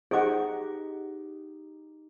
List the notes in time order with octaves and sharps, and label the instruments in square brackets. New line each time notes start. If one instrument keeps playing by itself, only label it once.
[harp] D#4 G4 [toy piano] G#4 D6 [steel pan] C5 D#5 F#5